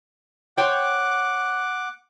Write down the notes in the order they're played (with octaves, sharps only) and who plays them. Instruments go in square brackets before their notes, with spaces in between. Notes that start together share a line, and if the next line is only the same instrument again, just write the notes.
[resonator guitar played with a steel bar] C5 C#5 G5 [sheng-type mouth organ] F#5 D6